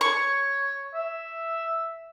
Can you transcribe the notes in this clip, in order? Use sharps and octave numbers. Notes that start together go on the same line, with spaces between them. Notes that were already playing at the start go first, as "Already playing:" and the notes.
C#5 C#6
E5